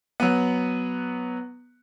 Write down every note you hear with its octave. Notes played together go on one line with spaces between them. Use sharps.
F#3 B3